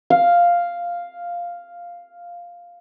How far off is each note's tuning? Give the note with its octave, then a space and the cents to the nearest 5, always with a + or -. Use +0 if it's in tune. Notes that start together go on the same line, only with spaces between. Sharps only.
F5 +0